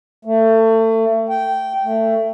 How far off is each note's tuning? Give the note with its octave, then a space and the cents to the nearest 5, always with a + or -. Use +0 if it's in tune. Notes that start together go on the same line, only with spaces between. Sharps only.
A3 +30
G5 -15
A3 +20